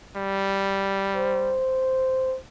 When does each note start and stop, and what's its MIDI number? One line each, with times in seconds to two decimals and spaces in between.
0.16 1.62 55
1.16 2.37 72